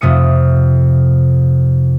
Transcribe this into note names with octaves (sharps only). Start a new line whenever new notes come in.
F2 C3 A3 D#6 C#7